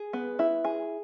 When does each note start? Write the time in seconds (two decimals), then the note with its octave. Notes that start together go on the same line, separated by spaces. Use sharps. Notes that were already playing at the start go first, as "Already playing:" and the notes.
Already playing: G#4
0.13 B3
0.39 E4
0.65 G#4